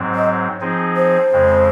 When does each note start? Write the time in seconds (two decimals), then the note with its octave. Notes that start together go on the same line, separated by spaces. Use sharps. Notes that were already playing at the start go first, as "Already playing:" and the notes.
Already playing: G#2 F#3 C4
0.14 D#5
0.61 F3 C4 D#4 G#4
0.96 C5
1.32 F2 C#3 G#3 C4